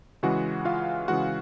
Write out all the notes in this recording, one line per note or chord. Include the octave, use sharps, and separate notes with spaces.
C#3 E3 G#3 F#4 F#5
F4 F5
C#3 E3 G#3 F#4 F#5